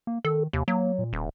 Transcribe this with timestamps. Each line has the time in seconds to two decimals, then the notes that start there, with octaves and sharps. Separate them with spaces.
0.07 A#3
0.25 D#3 A4
0.53 D#2 C3
0.68 F#3 A#3
0.99 A#2
1.13 D#1